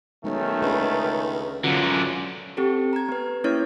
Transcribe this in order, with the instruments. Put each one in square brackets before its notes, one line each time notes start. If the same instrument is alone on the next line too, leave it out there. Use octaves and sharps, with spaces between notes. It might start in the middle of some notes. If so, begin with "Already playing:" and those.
[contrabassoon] B1 [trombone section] D#3 A3 C#4 [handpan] G#3
[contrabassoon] C#2 [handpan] D4 G#4 B4
[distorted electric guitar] F#2 D3 [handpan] C#4 F4 F#4
[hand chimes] C4 G4 A4
A#5 G#6
B3 B4
A#3 C#4 E4 C#5 F6 G#6